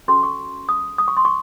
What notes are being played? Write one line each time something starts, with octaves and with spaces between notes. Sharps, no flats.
C#4 F#4 A4 C6
C#6
D#6
D#6
C#6
C6
C#6